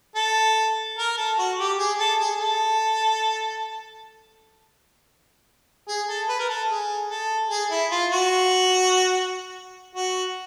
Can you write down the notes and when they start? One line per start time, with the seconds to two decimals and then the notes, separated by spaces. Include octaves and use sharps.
0.15 A4
0.98 A#4
1.17 A4
1.38 F#4
1.59 G4
1.78 G#4
1.99 A4
2.19 G#4
2.40 A4
5.88 G#4
6.08 A4
6.29 B4
6.39 A#4
6.49 A4
6.69 G#4
7.10 A4
7.50 G#4
7.70 E4
7.91 F4
8.12 F#4
9.95 F#4